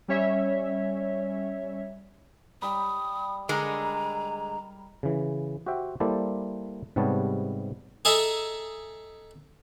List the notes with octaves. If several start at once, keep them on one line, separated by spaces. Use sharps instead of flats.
G3 C#4 C#5 E5
G3 B5 D#6
D3 G#3 A#4 A#5
C#3 E3
F#4 G4 C5 E5 G5
G3 A#3 E4 A4 C5 D5
G#2 C3 G3 B3 C#5 A5
G#4 A4 D#5 E5 A#5